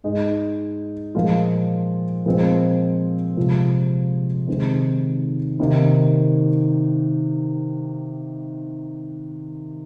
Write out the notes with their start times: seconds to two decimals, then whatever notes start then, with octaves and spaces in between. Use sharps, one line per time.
0.04 G#2 G#3 D#4
1.15 A#2 F3 G#3 F4
2.26 A#2 F3 G#3 C4
3.37 C3 F3 G#3 F4
4.48 C3 D#3 G#3 C4
5.59 C3 D#3 A#3 D#4